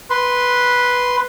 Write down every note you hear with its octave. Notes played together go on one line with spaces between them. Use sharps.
B4 C6